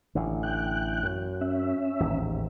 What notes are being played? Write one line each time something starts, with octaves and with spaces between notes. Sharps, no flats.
A1 D3
G5 F#6
F#2
C#4 E5
A1 D#2 G#2